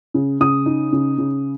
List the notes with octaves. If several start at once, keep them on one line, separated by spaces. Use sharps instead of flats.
C#3
C#3 D#6
D#4
C#3
C#3